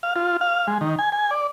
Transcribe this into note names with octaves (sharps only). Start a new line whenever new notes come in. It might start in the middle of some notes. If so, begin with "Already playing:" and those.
F5
F4
F5
G#3
D#3
G#5
G#5
D5